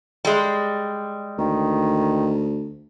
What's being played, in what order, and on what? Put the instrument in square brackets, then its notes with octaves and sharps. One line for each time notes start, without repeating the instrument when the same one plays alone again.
[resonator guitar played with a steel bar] G3 G#3
[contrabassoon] D2 [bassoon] D#3